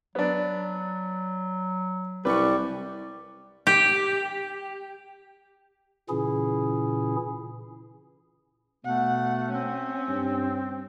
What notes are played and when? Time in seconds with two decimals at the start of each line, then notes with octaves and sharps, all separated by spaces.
0.15 F#3 B3 D4
2.25 C2 G3 B4 C#6
3.67 G4
6.09 A#2 C#3 E3 C#4 E4 G#4
8.85 B2 A3 F#5
9.51 C4 C#4
10.08 G2